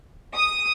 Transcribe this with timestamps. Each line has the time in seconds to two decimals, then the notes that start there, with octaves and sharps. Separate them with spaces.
0.36 D#6